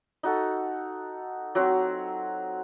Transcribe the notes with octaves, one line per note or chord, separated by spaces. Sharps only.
D#4 F#4 A4
F#3 C4 F#4